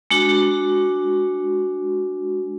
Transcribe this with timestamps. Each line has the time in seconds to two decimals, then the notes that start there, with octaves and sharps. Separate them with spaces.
0.11 G#3 D4 F#4